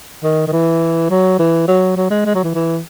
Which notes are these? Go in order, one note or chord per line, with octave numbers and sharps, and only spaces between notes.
D#3
D#3
E3
F#3
E3
F#3
F#3
G#3
G#3
F#3
E3
E3